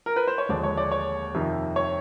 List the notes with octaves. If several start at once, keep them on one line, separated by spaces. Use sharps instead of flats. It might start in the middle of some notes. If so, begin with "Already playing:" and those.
A#4
B4
C5
C#5
D#2 D3 F3 G#3 D5
C#5
D5
C#5
F2 C3 D#3
C#5